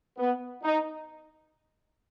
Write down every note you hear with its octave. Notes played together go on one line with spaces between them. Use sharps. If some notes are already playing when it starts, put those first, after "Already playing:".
B3
D#4